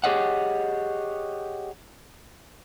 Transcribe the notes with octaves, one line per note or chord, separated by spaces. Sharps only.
G4 G#4 C#5 D#5 F#5